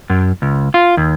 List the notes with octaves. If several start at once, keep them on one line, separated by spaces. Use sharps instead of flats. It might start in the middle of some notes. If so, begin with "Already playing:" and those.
F#2
C#2
F4
D#2